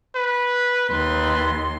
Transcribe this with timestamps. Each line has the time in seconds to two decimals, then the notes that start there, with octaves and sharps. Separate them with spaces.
0.16 B4
0.90 D#2 B4 C6